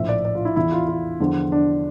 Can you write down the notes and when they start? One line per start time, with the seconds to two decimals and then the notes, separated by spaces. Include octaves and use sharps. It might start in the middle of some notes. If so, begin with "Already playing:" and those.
Already playing: A#1 A2 F3 E5
0.09 D5
0.25 D5
0.35 F4
0.45 E4
0.56 E2 E3 E4
0.72 F4
0.88 F4
1.20 E2 D3 F3
1.52 D4